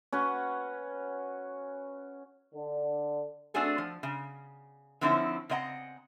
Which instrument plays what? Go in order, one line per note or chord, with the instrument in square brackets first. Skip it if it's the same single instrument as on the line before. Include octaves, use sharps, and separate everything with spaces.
[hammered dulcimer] C#4 F#4 B4 F#5
[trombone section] D3
[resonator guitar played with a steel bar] A3 C4 D4 F#4 G#4 A4
F3
C#3
D3 F3 C4 C#4 D#4 E4
C#3 C4 D#5 F#5 A#5